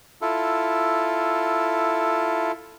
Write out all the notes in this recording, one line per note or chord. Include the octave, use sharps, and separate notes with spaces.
E4 F4 A4